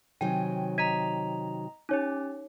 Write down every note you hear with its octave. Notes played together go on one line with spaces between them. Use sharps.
C3 D#3 F#3 G5 G#5
D#5 A#5 G#6 B6 D#7
C#4 D#4 G4 C#5